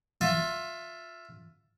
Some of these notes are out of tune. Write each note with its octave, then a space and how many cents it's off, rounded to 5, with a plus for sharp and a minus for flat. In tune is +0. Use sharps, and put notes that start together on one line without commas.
F4 +20 E5 +15